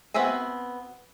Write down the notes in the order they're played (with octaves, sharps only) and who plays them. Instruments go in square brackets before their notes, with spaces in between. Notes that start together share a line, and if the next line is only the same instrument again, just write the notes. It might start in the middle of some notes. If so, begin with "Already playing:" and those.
[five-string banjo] B3 C4 F#4 E5 G#5